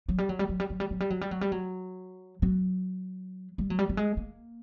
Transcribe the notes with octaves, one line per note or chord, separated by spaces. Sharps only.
F#3
G3
F#3
G3
F#3
G3
F#3
G3
F#3
G3
F#3
G3
F#3
G3
F#3
F#3
G3
F#3
G3
G3
G#3
A#3